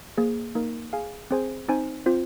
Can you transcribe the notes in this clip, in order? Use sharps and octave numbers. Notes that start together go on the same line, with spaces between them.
A#3 G#4 C5
A#3 D#4 A#4
G#4 F5 G#5
C4 G#4 C5 G#5
C4 D#4 C5 G#5
C4 F4 C5